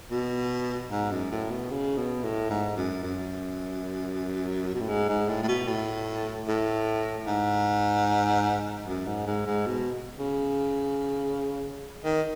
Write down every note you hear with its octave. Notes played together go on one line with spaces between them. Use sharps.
B2
G#2
F#2
A2
B2
C#3
B2
A2
G#2
F#2
F#2
B2
A2
G#2
G#2
A2
A2
B2
A2
A2
G#2
F#2
G#2
G#2
G#2
B2
C#3
D#3